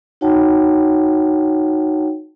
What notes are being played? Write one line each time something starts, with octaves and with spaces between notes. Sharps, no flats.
D#4 F#4 C#5 F#5 G5 A5